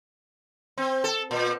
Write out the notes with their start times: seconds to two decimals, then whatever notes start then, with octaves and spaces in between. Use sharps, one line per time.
0.77 C4
1.04 A4
1.31 A#2